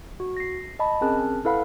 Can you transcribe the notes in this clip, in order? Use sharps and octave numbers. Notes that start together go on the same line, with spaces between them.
F#4
A#6 C7
D#5 A5 B5
C4 C#4 G#4 A#4 A5 F#6
E4 A4 B4 F5 F#5 B5